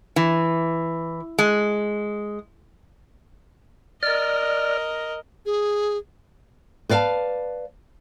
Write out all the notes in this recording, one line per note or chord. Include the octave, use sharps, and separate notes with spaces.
E3
G#3
A#4 D5 D#5 F6
G#4
B4 D5 F5 G5 A5